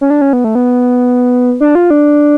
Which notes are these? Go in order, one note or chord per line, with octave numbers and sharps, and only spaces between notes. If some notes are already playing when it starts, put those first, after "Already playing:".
C#4
D4
C#4
B3
A3
B3
D4
F4
D4